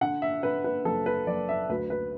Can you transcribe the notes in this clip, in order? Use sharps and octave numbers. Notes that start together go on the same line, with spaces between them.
D3 F#5
E5
D3 B4
B4
F#1 A4
B4
F#1 D5
E5
D2 B4
B4